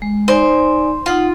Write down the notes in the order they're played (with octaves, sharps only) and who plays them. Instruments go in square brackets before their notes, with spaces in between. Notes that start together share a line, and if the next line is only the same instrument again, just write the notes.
[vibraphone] G#3
[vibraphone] D#4 D5 G#5 [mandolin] C5
[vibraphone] D#4 F#5 C6 [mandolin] F4